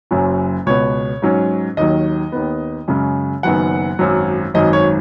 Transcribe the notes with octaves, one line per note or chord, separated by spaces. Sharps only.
F#1 F#2 F#3 C#4
C#2 B2 B3 C#5
G#2 F#3 C#4
D#2 D#3 F#3 D#5
D#2 D#3 B3
F#2 C#3 G#3 C#4
F#1 F#2 D#3 F#3 B3 F#5
G#1 F#2 F#3
G#1 F#2 D#3 F#3 D#5
C#5